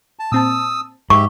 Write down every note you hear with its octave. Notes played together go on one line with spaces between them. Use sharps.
A5
A#2 C4 A5 D#6 E6
G#2 G4 E5 C#6